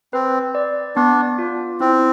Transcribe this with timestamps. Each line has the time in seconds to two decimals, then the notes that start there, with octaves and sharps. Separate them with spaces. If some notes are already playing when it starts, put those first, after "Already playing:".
0.13 C4 B4
0.55 D5
0.96 B3 D4
1.39 F4
1.80 C4 E4